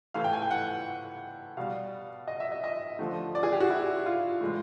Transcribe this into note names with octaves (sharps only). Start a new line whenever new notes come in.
A2 E3 A3 F5
G5
G#5
G5
F#5
B2 G3 F5
D#5
E5
D#5
D#5
D3 F3 A3
D5
G#4
G4
F#4
E4
F4
A2 E3 G#3